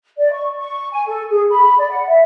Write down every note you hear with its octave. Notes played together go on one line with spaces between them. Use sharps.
D5
C#6
C#6
G#5
A4
G#4
B5
D5
F#5
E5